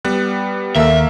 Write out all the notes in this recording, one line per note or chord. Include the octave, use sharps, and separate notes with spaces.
G3 B3 F#6
D#2 A#3 A4 E5